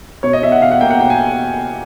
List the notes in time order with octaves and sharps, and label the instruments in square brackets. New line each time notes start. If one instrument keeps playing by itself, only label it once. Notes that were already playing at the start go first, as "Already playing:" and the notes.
[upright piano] B2 C#5
D#5
E2 E5
F#5
B2 F5
F#5
A#3 G5
F#5
B2 G5
G#5